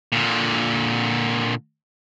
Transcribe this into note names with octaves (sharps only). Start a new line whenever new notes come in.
A#2 D3